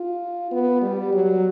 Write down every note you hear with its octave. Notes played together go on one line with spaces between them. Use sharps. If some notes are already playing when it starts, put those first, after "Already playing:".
Already playing: F4
B3
G3
F#3